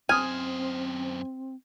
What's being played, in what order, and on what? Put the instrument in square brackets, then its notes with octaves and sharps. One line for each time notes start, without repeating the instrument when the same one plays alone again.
[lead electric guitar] F#2 C5 [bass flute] C4 [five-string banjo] G#5 [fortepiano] D#6 F6